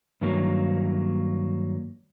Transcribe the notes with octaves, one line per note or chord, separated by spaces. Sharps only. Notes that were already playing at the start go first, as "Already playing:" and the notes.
G2 D#3 F#3 A#3